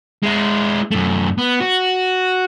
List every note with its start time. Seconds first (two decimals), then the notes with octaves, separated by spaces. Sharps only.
0.23 G#3 E4
0.91 F#2 A3
1.38 B3
1.61 F#4